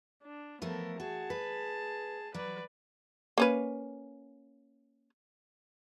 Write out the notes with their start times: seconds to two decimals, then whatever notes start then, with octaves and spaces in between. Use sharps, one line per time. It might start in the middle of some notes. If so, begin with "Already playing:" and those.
0.24 D4
0.62 F3 A3 B3 A4 A#4
1.00 F#4 G#4 A5
1.30 B4
2.34 F#3 B4 D5
3.38 A#3 C#4 B4